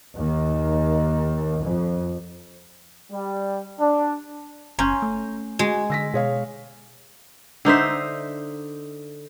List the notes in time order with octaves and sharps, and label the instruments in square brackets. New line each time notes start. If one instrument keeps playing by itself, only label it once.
[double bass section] D#2
F2
[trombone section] G3
D4
[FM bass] F#1 [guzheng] C#4 [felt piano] A#5 C6 G6
[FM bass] A3
[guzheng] G#3 [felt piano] F#4
[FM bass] D3 [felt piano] E6 A#6 B6
[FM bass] B2 [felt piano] G#4 C#5 F5
[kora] D3 D#4 C5 E5